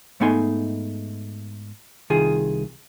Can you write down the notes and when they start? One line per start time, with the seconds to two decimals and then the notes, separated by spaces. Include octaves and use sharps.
0.20 G#2 A3 B3 D#4 G#5 C6
2.10 C2 D#3 F4 G#4